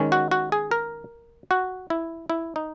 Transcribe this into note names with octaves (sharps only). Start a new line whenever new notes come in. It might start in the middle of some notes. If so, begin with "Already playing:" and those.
Already playing: D#3 G#3 C#4
F#4
F#4
G#4
A#4
F#4
E4
E4
D#4